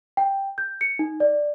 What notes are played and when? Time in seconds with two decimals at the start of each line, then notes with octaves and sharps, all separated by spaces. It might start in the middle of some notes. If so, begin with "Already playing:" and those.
0.17 G5
0.58 G6
0.81 C#7
0.99 D#4
1.20 D5